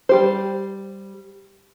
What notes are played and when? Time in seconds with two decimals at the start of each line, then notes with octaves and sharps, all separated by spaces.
0.09 G3 G4 C5